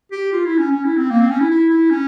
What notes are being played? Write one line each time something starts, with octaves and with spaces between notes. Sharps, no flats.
G4
F4
E4
C#4
C#4
E4
C4
A#3
C4
C#4
E4
E4
E4
C#4